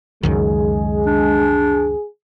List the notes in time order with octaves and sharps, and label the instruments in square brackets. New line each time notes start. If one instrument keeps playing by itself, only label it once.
[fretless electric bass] C#2 F#2 D#3 [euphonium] G#3 [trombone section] G#4
[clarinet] D4